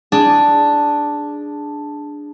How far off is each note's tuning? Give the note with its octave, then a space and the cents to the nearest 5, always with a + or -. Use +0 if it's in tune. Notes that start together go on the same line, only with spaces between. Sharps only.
D4 +0 G#4 +0